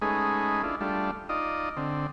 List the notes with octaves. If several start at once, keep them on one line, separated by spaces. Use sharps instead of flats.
G#3 A3 C#4 D#4 G#4 B4
D4 E4 F4
G3 A3 D4 F4
D#4 F4 D5 D#5
D3 C4